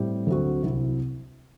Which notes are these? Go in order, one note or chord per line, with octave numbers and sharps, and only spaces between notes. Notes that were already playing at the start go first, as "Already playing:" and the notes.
Already playing: A2 G3 C4 G4
D2 D3 F#3 C4 F#4
C2 C3 F#3 C4 E4